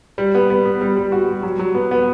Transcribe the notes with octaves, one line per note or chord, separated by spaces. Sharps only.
G3
B3
B3
B3
G3
G3
F#4
G3
F#3
F#3
B3
B3